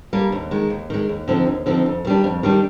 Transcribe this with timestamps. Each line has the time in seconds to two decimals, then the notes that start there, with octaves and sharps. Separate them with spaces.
0.13 G3 A#3 D4
0.32 D#2
0.51 D#3 G#3
0.70 D#2
0.90 D#3 G#3
1.09 D#2
1.28 D3 F3 C4 D#4
1.47 D#2
1.66 D3 F3 C4 D#4
1.86 F2
2.05 D#3 G3 D4
2.24 F2
2.43 D#3 G3 D4